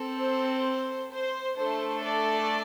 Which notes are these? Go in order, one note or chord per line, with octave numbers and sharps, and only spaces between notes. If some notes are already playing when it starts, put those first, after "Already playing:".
Already playing: C4 A4
C5
C5
A3 D4 A4 C5
D5